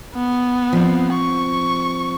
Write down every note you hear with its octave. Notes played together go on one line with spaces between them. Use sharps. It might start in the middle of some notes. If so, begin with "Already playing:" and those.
B3
F3 C4
C#6